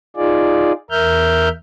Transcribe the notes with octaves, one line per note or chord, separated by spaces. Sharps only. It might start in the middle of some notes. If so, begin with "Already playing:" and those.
D#4 F4 G#4 D5
E2 A#4 E5 F6 G6